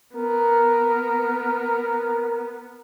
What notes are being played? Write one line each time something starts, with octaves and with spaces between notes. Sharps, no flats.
B3 A#4